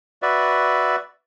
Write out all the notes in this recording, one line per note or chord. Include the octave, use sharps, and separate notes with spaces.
F#4 B4 D5 E5